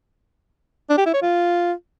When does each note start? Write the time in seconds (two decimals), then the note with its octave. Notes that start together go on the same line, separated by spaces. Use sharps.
0.90 D4
0.98 G4
1.06 E4
1.14 C#5
1.22 F4